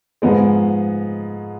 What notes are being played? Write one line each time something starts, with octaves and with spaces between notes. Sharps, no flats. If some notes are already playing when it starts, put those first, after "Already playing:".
G#2 F3 G#3 B3